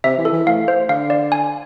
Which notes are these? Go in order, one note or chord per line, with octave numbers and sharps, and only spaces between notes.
C3 E5
E3
A4
E3
A2 F5
C5
D3 F5
D5
G#5